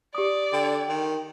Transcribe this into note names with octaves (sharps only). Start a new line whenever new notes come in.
G4 D5 D#6
D3 G5
D#3